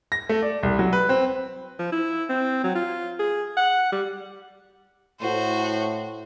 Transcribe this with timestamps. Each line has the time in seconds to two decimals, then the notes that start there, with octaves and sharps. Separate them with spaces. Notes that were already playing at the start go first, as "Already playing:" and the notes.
0.12 A#6
0.29 A3
0.42 D5
0.63 C2
0.79 F#3
0.93 B4
1.09 C4
1.79 F3
1.92 E4
2.29 C4
2.64 F#3
2.75 F4
3.19 G#4
3.57 F#5
3.92 G3
5.20 A2 F#4 C5